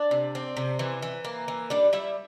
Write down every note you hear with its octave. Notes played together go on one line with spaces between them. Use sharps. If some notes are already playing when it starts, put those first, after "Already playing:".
Already playing: D4 D5
C3
C4
C3
E3
E3
A#3
E3
G3 D4 D5
G3 E4 E5